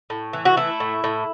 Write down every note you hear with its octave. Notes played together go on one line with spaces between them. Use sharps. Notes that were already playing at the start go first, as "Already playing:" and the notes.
A2
E3
F#4
A3 E4
A2
A2